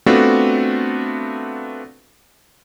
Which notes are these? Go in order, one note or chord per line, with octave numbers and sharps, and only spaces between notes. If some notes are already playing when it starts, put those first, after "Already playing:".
A3 B3 C4 D4 F4 F#4